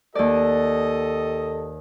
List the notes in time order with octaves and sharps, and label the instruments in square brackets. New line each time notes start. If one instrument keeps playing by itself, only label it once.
[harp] D#2 D5 [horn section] G4 A4 D#5